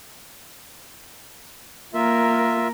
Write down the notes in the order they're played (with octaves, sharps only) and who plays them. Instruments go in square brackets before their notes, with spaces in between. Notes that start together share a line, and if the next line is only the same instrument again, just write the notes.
[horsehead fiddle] A#3 A#4 [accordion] F4 E5